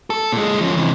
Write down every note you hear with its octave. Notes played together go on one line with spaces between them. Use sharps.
A4
A#2 G#3
F3 C#4
C3 E3